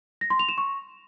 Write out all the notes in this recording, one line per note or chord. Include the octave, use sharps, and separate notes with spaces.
A#6
C6
F7
E7
C#6